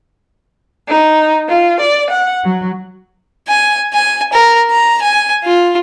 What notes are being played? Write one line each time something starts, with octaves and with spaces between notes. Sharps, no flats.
D#4
F4
D5
F#5
F#3
G#5
G#5
A#4
A#5
G#5
F4